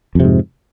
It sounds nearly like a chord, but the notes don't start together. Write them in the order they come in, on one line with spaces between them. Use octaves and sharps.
F2 C3 G#2